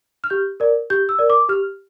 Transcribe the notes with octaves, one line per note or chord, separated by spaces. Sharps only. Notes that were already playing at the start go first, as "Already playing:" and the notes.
F6
G4 G6
A#4 D5
G4 G6
E6
A#4 D5
D6
G4 F6